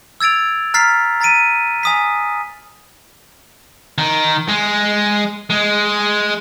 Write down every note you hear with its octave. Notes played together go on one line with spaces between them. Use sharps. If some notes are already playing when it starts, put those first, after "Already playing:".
E6 G#6 A6 D7 F7
A#5 F6 A6 B6 C7
A#5 A6 B6 D7 D#7
G#5 D#6 B6
D#3
G#3
G#3